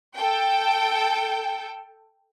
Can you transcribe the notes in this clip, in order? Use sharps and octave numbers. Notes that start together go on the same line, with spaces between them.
A4 G5